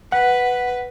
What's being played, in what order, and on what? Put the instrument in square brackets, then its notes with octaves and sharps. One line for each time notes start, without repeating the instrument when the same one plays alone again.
[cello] B4 [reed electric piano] F#5